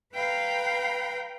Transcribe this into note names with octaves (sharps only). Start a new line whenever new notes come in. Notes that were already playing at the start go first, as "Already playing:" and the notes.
B4 F5 G5 A#5 B5